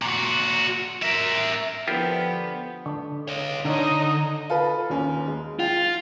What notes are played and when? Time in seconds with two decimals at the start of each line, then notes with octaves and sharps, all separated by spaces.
0.02 A#2 F#4
1.03 A#4 E5
1.88 D3 F3 B3 E4 F4 G4 A#4
2.86 D3
3.28 C#5 D#5
3.65 D3 D4 D#4 C#5 D#5
4.50 F4 A4 B4
4.90 D#2 C#4
5.27 G#3
5.59 F4 G5